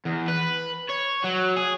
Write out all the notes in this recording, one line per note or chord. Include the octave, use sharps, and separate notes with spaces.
E2
B4
C#5
F#3
G#4